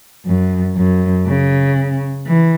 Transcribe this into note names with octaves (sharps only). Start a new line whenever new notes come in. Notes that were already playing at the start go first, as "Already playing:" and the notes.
F#2
F#2
C#3
E3